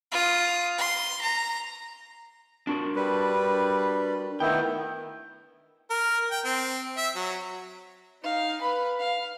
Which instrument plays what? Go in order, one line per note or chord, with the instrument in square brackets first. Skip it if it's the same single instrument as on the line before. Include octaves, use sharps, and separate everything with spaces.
[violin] F4 D#6
C6
A#5
[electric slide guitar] D4 F#4 A#4
[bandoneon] G3 B4
[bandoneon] D#3 B3 E4 [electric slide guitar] A3 G5
[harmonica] A#4
G5
C4
E5
F#3
[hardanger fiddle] D#4 F5
B4 B5
F5